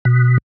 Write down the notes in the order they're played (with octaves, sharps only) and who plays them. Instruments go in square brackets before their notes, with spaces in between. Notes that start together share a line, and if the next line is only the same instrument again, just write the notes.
[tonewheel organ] B2